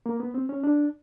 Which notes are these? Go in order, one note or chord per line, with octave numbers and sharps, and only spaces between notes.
A#3
B3
C4
C#4
D4